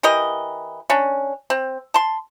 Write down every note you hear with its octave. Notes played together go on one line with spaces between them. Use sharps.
E3 G4 A#4 D#5
C#4 D4
C4
A5 C6